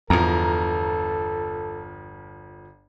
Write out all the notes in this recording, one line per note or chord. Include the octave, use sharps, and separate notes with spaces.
G1 E2 F3 A4 A#5